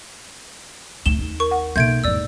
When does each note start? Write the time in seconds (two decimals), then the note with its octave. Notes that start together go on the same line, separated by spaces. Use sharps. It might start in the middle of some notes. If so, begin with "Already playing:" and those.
1.06 D2 A3 E7 G7
1.18 G#1 D#2
1.40 A#4 C#6
1.51 F#5
1.76 B1 B2 E3 A#3 E5 G6 G#6 D7
2.04 E2 G#2 D5 E6